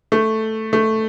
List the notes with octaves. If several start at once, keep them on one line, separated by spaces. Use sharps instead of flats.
A3
A3